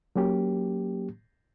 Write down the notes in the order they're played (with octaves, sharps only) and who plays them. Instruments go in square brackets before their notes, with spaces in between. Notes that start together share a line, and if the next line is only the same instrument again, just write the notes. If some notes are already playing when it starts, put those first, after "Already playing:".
[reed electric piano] F#3 A#3 C#4 G4